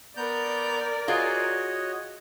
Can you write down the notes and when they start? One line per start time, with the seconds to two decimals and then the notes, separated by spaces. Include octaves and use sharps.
0.17 B3 A#4 D5 A#5 G6
1.08 F4 F#4 G#4 C#5 D#5